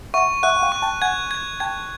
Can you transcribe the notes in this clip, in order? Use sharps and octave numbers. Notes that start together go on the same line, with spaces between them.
E5 F#5 C#6
E5 F#5 F#6
F#5
F5 G5
C#6
G5 A5
F#5 G#5 G#6
G#6
G5 A5 G#6